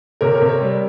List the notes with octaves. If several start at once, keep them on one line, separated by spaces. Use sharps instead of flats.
C3 A#4 C#5
A#4 C#5
C3
A#4 C#5
G3